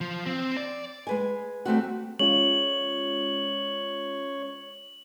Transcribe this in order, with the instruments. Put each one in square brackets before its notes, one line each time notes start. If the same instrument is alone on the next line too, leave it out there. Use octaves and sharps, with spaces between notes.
[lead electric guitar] F3
C4
D5
[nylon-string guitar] G#3 B4 G#5
G3 A3 C4 F#4
[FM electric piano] G#3 C#4 F4 [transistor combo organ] C#5 [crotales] F#7